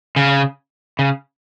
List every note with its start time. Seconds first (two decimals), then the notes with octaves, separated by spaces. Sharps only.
0.16 C#3
0.99 C#3